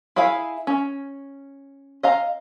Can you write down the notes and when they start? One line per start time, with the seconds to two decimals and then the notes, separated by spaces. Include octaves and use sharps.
0.16 E4 G#4 E5 F5
0.67 C#4
2.03 D#5 F5 A#5